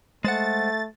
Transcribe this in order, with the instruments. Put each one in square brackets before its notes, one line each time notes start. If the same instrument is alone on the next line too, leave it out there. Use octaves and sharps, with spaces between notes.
[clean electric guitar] G#3 C5 F#5 [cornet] A3 [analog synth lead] A6